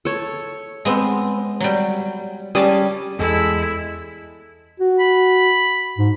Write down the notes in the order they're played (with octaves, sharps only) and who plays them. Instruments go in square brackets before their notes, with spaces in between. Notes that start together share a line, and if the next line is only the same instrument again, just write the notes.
[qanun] A4 C#5
[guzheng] G#3 B3 C4
F#3 G3
[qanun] G3 C#4 G#5 [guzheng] G#4 D5 A5
[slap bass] E2 B3 [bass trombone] G#3 [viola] E4 [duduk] A4
[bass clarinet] F#4
[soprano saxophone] B5
[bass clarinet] G#2